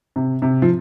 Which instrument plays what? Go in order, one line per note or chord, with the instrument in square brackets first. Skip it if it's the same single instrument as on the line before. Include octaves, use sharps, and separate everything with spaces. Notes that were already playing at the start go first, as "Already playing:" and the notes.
[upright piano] C3
C3
F3